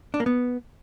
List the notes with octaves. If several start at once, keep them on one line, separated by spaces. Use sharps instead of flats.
D4
A#3
B3